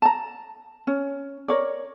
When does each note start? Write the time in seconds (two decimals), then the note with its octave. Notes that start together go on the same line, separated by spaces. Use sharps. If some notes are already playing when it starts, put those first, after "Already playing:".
0.02 A5 A#5
0.87 C#4
1.48 A#4 C#5 D5